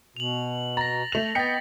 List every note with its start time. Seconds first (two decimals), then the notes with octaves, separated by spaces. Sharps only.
0.17 B2 F7 F#7
0.77 A#5 A6 A#6
1.12 A3 F7
1.35 B3 D#5 G5 A6 B6 C#7